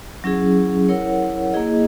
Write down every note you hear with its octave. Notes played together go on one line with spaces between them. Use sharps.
F#3 C#4 E4 G#4
E4 A#4 C#5 F#5
A#3 E4 G#4 D#5